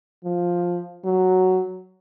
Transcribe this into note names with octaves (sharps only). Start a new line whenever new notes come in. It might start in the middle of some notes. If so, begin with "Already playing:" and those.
F3
F#3